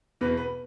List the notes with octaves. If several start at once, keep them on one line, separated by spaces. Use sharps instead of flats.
E2 B2 B4
B4